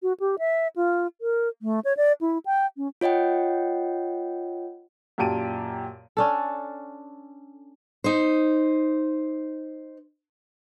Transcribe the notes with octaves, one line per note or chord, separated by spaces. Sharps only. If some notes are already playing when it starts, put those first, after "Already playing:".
F#4
G4
E5
F4
A#4
A3
C#5
D5
E4
G5
C#4
F4 C#5 D#5 F#5 G5
F#2 A#2 G4 A5 D7 D#7
C#4 D4 A4
D#4 C5